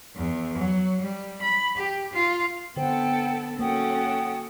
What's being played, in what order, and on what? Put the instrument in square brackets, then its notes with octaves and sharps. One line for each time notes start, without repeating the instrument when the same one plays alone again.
[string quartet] E2
F#3
G3
B5
G4
F4
[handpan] D3 C5 [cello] B3 A4 [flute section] F#5 G5
[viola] F#3 A4 [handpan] A#3 [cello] C#4 [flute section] F#5 G5 D#6